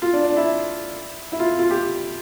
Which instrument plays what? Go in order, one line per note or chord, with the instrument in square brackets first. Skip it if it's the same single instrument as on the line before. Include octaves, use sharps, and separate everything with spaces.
[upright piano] F4
D4
D4
E4
E4
F4
F4
G4